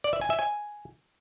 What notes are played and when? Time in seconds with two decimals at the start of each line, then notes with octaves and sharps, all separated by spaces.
0.04 D5
0.13 E5
0.21 G#5
0.30 E5
0.39 G#5